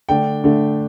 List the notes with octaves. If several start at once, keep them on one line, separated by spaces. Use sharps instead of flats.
D3 A3 D4 G5
D3 A3 D4